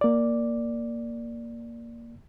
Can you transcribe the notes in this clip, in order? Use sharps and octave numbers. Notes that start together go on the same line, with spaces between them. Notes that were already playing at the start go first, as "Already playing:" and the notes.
A#3 D5